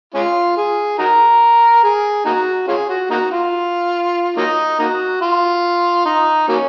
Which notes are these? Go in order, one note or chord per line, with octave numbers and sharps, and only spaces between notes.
G#3 C#4 F4
G#4
D#4 F#4 A#4
G#4
A#3 D#4 F#4
C#4 F4 G#4
F#4
A#3 D#4 F#4
F4
F#3 A#3 D#4
A#3 D#4 F#4
F4
D#4
F#3 A#3 C#4